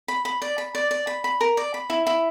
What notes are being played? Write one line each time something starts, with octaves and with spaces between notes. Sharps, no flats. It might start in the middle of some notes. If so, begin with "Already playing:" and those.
B5
B5
D5
B5
D5
D5
B5
B5
A#4
D5
B5
E4
E4